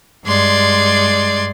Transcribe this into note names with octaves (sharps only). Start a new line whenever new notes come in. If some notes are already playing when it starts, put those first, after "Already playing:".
G2 G#3 D5 C6 G#6